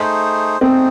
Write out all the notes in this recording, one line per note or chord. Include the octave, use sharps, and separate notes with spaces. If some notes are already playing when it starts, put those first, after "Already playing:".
Already playing: A3 D#4 G#4 C5
A3 C4 D#4 G#4 C5